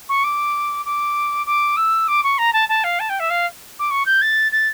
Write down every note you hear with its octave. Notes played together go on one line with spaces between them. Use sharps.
C#6
D6
D6
D6
E6
D6
C#6
A#5
A5
A5
F5
A5
G5
E5
F5
D6
C#6
G6
A6
A6